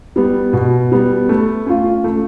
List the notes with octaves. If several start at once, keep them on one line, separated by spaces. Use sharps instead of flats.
G3 B3
B2
G3 B3
A3
C#4 F4
A3